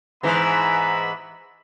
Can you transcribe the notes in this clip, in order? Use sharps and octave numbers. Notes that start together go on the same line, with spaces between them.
G#2 E3 B3 E5 A#5 B5